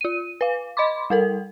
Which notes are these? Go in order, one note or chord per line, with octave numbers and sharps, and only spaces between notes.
F4 D#7
B4 F5
D#5 B5 C6 D6
G3 A4 A#4